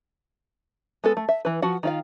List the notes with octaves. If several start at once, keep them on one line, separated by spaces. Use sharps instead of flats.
G#3 B3 A4
A3
E5
E3 B4
F3 F#4 F#5
D#3 F4 F5